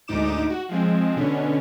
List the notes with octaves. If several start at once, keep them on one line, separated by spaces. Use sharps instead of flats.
D2 G#2 D#4 D6 E7
F#4
F3 G#3 C4
B2 D3 C#4